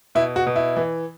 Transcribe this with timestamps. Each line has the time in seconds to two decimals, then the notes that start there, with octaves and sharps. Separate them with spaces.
0.15 B2 E4
0.36 F#4
0.47 B2
0.56 E4
0.77 E3